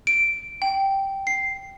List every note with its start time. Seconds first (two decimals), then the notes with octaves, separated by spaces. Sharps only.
0.07 D7
0.62 G5
1.27 C7